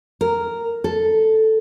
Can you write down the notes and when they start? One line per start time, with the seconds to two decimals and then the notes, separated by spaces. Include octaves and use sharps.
0.21 A#4
0.84 A4